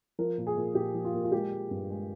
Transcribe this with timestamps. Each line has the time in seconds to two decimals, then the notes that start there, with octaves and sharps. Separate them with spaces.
0.19 F3 A#4
0.38 A#2
0.47 G#4
0.57 A#2
0.75 A#2 G4
0.94 F3
1.05 F4
1.14 A#2
1.23 F4
1.32 G#3 G4
1.52 G#3
1.71 G2
1.90 G#3